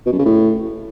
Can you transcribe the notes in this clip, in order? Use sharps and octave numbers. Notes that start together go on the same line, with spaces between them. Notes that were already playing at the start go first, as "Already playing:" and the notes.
B2
F#2
C#3
A2